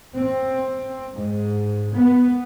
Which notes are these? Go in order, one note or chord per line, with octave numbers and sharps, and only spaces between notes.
C4
G#2
B3